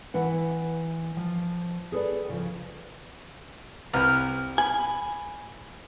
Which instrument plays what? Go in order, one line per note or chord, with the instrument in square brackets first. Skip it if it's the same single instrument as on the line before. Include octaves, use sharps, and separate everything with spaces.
[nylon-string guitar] E3 B4 F#5
F3
G#4 A4 B4 D5
C#3 F3
[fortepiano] C2 B4 A#5 [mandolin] F6 G6
[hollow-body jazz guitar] G#5 [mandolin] B5